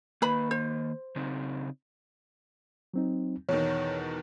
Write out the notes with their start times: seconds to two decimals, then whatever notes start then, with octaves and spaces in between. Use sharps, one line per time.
0.22 D#3 A#3 B4 B5
0.51 C5
1.16 C#3 C4 D#4
2.94 F#3 C4 D#4
3.49 E2 B2 D#3 C#5